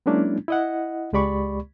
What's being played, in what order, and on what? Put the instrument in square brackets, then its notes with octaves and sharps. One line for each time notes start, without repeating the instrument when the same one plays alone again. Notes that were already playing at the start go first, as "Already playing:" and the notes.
[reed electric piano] F#3 G#3 A#3 C#4 D4 E4
E4 D#5 F#5
C#2 G#3 G4 D5 B5 C#6